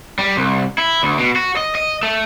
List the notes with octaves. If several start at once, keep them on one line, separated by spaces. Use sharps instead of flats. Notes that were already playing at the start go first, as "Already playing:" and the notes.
G3
C2
E4
D2
B2
F#4
D#5
D#5
A3